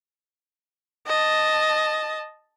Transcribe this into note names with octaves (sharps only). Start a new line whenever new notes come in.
D#5 A5